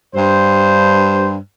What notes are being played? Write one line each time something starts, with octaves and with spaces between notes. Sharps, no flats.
G2 C5